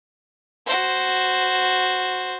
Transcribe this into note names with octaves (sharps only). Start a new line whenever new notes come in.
F#4 C5